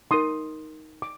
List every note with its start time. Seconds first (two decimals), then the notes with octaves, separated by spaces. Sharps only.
0.11 D#4 A#4 C6 D#6
1.02 D6